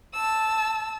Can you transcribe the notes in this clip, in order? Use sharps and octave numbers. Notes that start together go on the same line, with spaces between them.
A5 E6